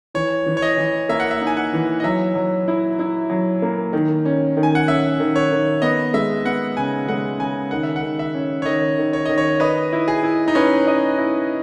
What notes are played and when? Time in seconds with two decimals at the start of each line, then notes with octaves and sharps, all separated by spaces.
0.14 E3 C#5
0.46 E3
0.57 C#5
0.62 D#5
0.78 E3
1.09 A#3 E5
1.20 F#5
1.31 E5
1.41 D#4
1.47 G#5
1.57 F#5
1.73 E3
2.00 D#5
2.04 F#3 E5
2.35 F#3
2.68 E4
2.99 E4
3.30 F#3
3.62 A#3
3.93 D#3
4.25 C#4
4.57 D#3
4.63 G#5
4.75 F#5
4.88 C#4 E5
5.20 D#3
5.36 C#5
5.51 D#3
5.82 B3 D#5
6.14 G#3 E5
6.45 B3 F#5
6.77 C#3 G#5
7.08 G#3 F#5
7.40 C#3 G#5
7.71 D#3 F#5
7.83 E5
7.96 F#5
8.03 D#3
8.19 E5
8.35 C#4
8.62 C#5
8.65 D#3 D#5
8.98 D#3
9.13 C#5
9.26 D#3 D#5
9.38 C#5
9.60 B4 D#5
9.93 E4
10.08 G#4
10.23 E4
10.48 D#4
10.55 C#4 B4
10.87 D#5
11.18 E4